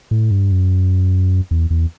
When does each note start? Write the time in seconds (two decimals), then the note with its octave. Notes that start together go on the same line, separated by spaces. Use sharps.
0.11 A2
0.31 G2
0.52 F#2
1.51 E2
1.70 E2